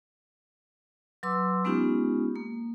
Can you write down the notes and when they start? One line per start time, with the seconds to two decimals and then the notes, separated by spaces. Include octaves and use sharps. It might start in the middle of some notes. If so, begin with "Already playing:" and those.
1.23 F#3 B4 C6 D6 E6
1.65 G#3 B3 C#4 D#4 F4 G4
2.36 A#3